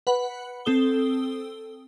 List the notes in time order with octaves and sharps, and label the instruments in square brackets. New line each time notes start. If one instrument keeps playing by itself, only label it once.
[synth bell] B4 F#5 B5
C4 A4 D#6 G7